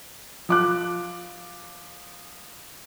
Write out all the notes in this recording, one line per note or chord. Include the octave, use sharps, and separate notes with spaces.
F3 D6 F#6